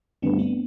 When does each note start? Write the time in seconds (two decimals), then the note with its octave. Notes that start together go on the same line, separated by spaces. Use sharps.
0.22 G2 D3 G3 A3 B3 C4
0.39 B3 D4